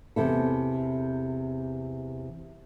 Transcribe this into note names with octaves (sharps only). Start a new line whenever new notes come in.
E2 C3 E4 A4